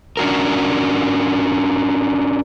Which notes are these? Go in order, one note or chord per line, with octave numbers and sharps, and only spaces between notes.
C#4 D4 F#4 A#4